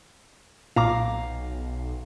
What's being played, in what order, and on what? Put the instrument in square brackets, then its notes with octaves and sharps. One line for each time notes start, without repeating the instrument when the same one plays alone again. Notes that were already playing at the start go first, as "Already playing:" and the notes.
[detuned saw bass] B1 [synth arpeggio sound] A#2 [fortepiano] F5 A#5 D6